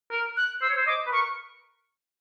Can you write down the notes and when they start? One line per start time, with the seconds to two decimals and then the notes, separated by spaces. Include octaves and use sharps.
0.11 A#4
0.37 F#6
0.62 C5 E6
0.69 C#5
0.77 C5
0.87 D#5 D6
1.07 B4
1.12 A#4 C#6